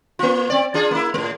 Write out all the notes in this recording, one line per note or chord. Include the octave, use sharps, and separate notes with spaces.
A#3 F4
C4 D5
D4 F4 G#4
A#3 E4
A2 A3